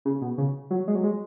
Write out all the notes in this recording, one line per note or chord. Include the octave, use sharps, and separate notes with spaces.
C#3
B2
C#3
F#3
G#3
F#3
G#3